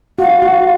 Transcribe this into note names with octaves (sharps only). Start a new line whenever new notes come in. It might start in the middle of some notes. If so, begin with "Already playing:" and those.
F#4 F5
F#4